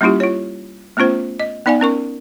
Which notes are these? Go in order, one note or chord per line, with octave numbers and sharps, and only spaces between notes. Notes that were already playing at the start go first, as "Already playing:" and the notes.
G3 A#3 C#4 E4 F4 G4
F4 C#5
A3 B3 C#4 F4 C5
D#5
B3 D#4 D5 F5 G#5
B3 C#4 A#4 C#6